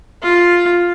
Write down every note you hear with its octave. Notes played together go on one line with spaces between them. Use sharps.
F4